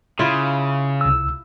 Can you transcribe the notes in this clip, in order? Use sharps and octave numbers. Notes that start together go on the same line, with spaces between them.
C#3 E4 F4
C2 E6